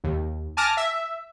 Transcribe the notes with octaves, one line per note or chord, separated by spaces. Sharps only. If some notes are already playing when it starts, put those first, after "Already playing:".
D#2
G#5 A5 D6 F6 A#6
E5